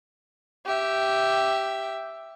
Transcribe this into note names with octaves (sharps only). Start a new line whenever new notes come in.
G4 E5